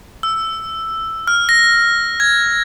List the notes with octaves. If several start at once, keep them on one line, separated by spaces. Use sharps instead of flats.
E6
F6
A#6
G#6